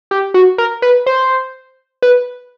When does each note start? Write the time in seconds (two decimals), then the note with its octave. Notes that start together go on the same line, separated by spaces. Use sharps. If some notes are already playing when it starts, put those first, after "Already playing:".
0.11 G4
0.34 F#4
0.58 A#4
0.82 B4
1.06 C5
2.02 B4